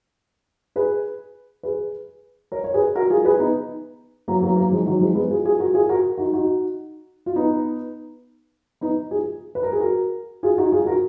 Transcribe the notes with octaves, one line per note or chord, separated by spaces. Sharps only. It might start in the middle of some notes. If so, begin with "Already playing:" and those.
G#4 B4
G#4 B4
A#4 C#5
C#5
G#4 B4
F#4 A#4
F4 G#4
G#4 B4
B3 D#4
F#3 A#3
F#3 A#3
F#3 A#3
F3 G#3
D#3 F#3
F3 G#3
G#3 B3
F4 G#4
F4 G#4
F#4 A#4
F4 G#4
F#4 A#4
D#4 F#4
D#4 F#4
F4
B3 D#4
B3 D#4
F4 G#4
B4
A#4
G#4
F#4 A#4
F4 G#4
D#4 F#4
F4 G#4
F#4 A#4